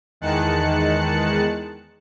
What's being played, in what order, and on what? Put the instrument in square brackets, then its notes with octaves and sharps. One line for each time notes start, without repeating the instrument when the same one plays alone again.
[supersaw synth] E2 D#3 G#3 A5 F#6 C#7